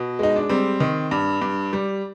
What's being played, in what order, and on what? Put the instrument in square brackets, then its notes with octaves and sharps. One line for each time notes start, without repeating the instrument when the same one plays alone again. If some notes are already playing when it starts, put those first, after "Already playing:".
Already playing: [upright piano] B2
G#3 D#4
D4
G3 C4
D#3
G2
G2
G3